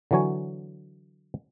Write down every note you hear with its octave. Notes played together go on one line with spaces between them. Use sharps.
D3 E3 F#3 C#5 G#5